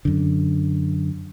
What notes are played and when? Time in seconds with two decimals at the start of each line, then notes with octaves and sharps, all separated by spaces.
0.05 F#2 D3